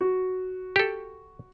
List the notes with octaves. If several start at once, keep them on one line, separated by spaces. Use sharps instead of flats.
F#4
G4 A4